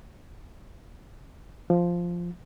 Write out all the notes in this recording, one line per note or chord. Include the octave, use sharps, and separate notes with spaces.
F3